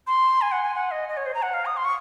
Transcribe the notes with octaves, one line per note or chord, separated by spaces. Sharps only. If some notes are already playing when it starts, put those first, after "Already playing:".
C6
G#5
F#5
G#5
F#5
D#5
D#5
C#5
C5
A#5
F#5
F5
D#6
C6
C#6